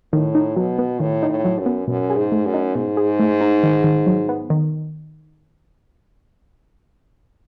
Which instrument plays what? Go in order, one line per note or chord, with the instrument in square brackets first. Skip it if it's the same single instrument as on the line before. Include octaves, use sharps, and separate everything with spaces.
[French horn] A2 [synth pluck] D#3
[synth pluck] D#4
[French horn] B2 [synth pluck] F#3
[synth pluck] B3
[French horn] A2 [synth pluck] D#3
[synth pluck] D#4
[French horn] A2
[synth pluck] F#3
[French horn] F#2
[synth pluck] B3
[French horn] F#2 [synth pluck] B2
[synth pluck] G#4
[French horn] G#2
[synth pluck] A3
[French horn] F#2
[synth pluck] D#4
[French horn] G#2 [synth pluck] B2
[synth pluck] G#4
A3
D#4
D#3
D#3
F#3
B3
D#3